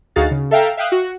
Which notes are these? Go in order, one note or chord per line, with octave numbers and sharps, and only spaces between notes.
D2 D#4 F#4 G#4 F5 A6
C#3
A4 E5 F5 G5 A#5
E5 F5 G5 D#6 F#6
F#4